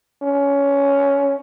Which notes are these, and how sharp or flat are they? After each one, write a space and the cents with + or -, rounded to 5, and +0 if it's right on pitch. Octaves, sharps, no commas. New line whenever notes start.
C#4 +15